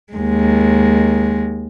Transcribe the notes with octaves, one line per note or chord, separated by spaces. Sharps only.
D#2 G#3